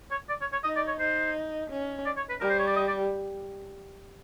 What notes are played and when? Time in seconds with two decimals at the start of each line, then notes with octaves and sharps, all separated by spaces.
0.11 C#5
0.29 D5
0.41 C#5
0.52 C#5
0.64 D#4 D#5
0.76 D5
0.88 C#5
0.99 D#4 C5
1.70 C#4
2.06 D5
2.17 C#5
2.29 B4
2.40 G3 A#4
2.50 C5
2.59 C#5
2.67 D5
2.76 D#5
2.87 D5